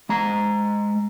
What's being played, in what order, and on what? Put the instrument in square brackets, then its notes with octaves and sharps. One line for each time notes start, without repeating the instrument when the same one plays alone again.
[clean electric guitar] G#3 A#5